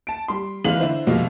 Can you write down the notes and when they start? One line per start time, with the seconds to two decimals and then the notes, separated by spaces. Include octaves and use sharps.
0.07 A5 D7
0.28 G3 C6
0.64 G#1 E3 G#3 F5 F#7
0.80 D3 E4 C5
1.07 C2 F2 B2 G#3 A#3 F4